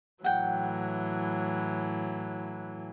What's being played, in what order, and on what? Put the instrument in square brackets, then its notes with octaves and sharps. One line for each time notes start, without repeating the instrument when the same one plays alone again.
[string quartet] A2 E3 F#3 [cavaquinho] F#5 G5